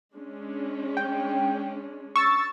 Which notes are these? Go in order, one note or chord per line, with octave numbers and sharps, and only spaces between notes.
G#3 C#4 D4
G5
C#6 E6 A6